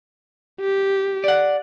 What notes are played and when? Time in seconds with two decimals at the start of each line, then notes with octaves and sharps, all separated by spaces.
0.61 G4
1.24 D5 F#5